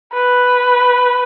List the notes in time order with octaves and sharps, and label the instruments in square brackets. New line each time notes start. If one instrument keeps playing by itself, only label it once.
[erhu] B4